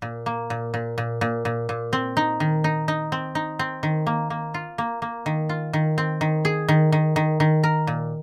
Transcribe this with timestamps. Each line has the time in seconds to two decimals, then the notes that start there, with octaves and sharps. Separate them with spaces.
0.02 A#2
0.26 A#3
0.50 A#2
0.74 A#2
0.98 A#2
1.21 A#2
1.45 A#2
1.69 A#2
1.93 C4
2.17 D#4
2.40 D#3
2.64 D#4
2.88 D#4
3.12 C4
3.35 D#4
3.59 C4
3.83 D#3
4.07 A#3
4.30 A#3
4.54 F4
4.78 A#3
5.02 A#3
5.26 D#3
5.49 F4
5.73 D#3
5.98 C4
6.21 D#3
6.45 G#4
6.68 D#3
6.92 D#3
7.16 D#3
7.40 D#3
7.63 A#4
7.87 A#2